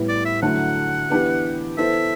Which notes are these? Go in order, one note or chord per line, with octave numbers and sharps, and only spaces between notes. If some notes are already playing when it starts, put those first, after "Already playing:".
Already playing: A2 G3 B3 E4 B4
D5
E5
D3 F#3 A3 E4 F#5
E3 B3 D4 G4 B4
E3 B3 E4 A4 C5 E5